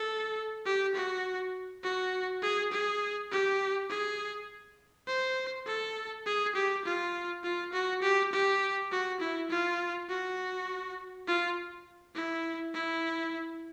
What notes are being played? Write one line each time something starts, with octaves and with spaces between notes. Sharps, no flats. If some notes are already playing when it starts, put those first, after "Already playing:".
Already playing: A4
G4
F#4
F#4
G#4
G#4
G4
G#4
C5
A4
G#4
G4
F4
F4
F#4
G4
G4
F#4
E4
F4
F#4
F4
E4
E4